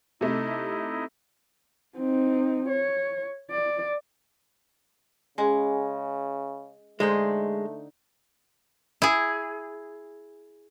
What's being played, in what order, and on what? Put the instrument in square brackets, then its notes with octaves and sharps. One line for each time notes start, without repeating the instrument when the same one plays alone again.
[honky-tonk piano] C3 A3 [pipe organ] D#4 E4 D#5
[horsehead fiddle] C4 D#4
C#5
D5
[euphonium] C#3 [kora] G#3 [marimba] C#4 G#4
[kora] D3 D#4 C5 [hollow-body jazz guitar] G#3 [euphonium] A3
[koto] E4 G#4